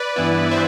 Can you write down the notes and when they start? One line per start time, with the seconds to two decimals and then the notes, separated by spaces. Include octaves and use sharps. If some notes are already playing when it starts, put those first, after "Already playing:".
Already playing: B4 D5
0.16 G2 E3 B3 E4
0.51 E3 C5 E5